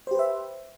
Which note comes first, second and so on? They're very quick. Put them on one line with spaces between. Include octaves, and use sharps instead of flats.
C5 G4 B4 E5